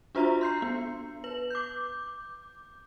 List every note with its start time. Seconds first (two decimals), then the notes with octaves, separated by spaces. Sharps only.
0.15 D4 F4 F#4 C5 E5 A#5
0.41 C6 G6 C7
0.62 B3
1.24 B4 F#7
1.50 D6 G6